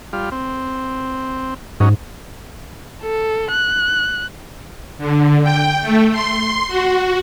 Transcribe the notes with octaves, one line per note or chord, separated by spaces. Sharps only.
G3 F4
C4
G#2 F#3 C#4 D#4
A4
F#6
D3
G5
A3
C6
F#4